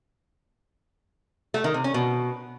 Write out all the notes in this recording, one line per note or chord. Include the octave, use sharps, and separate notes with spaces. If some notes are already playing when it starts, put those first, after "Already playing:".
A3
D#3
C3
C#4
B2